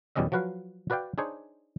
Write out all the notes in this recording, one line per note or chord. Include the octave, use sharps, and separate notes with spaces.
E2 B2 G3 C#4 D#5 E5
F3 F#3 F#4 B4 F5
F#4 B4 D5 F5 G5
D4 D#4 G#4 C5 C#5